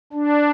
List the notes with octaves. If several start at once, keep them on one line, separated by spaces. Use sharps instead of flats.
D4